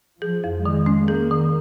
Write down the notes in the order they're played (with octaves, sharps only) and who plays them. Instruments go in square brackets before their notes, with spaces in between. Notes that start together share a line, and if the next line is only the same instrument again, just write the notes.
[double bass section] F3 [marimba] G#4
[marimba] F2
[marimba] D#3 [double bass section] G#3
[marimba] C#4
[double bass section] A#3 [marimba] G#4
[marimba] D#3